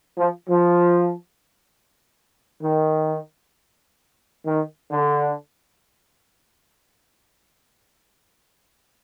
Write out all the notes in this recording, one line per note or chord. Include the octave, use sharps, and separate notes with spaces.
F3
F3
D#3
D#3
D3